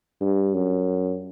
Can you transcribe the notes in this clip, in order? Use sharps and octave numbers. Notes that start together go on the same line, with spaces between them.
G2
F#2